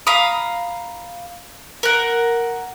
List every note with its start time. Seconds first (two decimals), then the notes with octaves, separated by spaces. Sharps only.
0.07 F5 A#5 B5 D#6
1.83 A#4 F#5